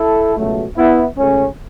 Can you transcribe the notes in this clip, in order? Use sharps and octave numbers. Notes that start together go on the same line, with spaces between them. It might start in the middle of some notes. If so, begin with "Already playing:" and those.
Already playing: E4 A4
C#2 B2 F#3 A3
B3 E4
C#2 C#3 A3 C#4